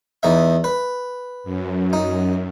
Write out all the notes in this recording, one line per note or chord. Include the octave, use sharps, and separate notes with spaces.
E2 D#4 E5
B4
F#2
D#4